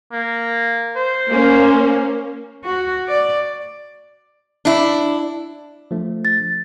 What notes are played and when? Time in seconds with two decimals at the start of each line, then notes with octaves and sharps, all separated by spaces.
0.12 A#3
0.96 C5
1.29 A#3 C#4
2.65 F#4
3.09 D5
4.65 D4 E4
5.91 F3 A3 D4
6.25 A6